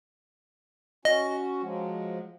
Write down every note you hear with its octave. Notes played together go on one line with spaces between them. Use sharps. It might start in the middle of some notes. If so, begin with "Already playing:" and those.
C#4 F#4 D#5
F3 F#3 G#3